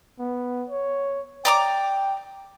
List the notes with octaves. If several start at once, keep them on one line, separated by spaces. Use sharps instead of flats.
B3
C#5
D5 G5 A#5 D6